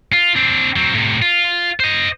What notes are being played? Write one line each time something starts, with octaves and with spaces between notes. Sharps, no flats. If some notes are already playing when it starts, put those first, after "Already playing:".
F4
C4 D4
F#3 C4
A2 C3
F4
C5 D#5